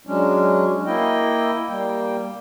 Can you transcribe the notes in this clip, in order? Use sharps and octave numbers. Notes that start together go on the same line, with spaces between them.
F#3 G#3 C#4 D4
A#3 E4 D#5 G5
G3 A#3 G5